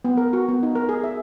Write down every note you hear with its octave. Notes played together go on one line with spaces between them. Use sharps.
B3
A#4
F#4
B3
D#4
A#4
G#4
E5